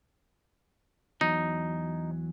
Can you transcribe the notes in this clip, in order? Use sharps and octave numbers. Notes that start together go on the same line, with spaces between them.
E2 F#3 D#4